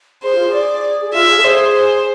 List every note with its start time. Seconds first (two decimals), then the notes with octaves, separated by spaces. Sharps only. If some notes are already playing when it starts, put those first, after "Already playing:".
0.23 G#4 C5
0.35 F4
0.47 G#4
0.54 D5
1.06 G#4
1.14 F4 E5
1.29 G#4
1.38 A4
1.44 G#4 C5
1.75 C5